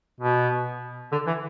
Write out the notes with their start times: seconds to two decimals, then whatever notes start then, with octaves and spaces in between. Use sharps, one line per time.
0.20 B2
1.12 D3
1.27 E3